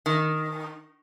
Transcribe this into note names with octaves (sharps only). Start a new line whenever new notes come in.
D#3